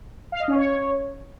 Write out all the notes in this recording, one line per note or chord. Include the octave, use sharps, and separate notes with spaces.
F5
D#5
C#4
C#5